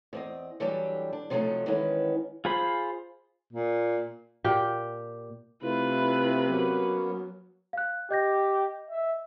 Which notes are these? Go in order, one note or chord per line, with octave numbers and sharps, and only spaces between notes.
E2 C4 D#5
E3 F#3 G3 D4 G4 A4
D4
C3 F3 F#3 A3 D#4 A4
D#3 E3 G#3 B3 C#4 E4
F4 G#4 C5 B5
A#2
A#2 G4 G5
C3 A3 E4 F4 B4
F#3 A#3 B3 C#4
F5 F#6
G4 D#5 G6 A#6
E5